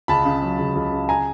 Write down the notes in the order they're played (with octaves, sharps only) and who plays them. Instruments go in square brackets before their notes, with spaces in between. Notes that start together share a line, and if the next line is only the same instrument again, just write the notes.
[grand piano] C#2 A5 B5
C#3
F#3
C#2
C#2
C#3
G#5 A#5